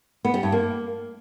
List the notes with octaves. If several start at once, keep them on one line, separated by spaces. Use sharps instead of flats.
B3
G3
G2
A#3